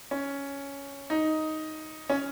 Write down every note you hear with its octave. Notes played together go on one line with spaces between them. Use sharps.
C#4
D#4
C#4